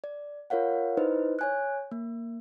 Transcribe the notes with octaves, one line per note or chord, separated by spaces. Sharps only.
D5
F4 A#4 C#5 F5 F#5
D#4 E4 B4 C5 D#5
C#5 G#5 F#6
A#3